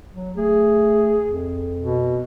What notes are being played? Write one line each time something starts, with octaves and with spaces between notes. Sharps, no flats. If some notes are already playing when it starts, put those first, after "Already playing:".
F#3
A3 G#4
F2
B2